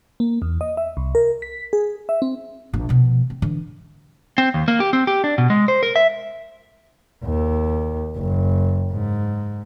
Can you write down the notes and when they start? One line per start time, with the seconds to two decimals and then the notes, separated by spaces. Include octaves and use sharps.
0.20 A#3
0.42 E2
0.61 D#5
0.77 E5
0.97 C2
1.15 A#4
1.42 B6
1.73 G#4
2.09 E5
2.22 C4
2.74 A#1
2.89 B2 F3
3.30 C4
3.42 D3 E3
4.38 C4
4.54 D#2
4.68 A#3
4.80 G4
4.93 C4
5.07 G4
5.24 D4
5.38 B2
5.50 G#3
5.68 C5
5.83 A#4
5.96 E5
7.24 D#2
8.16 F#1
8.92 G#2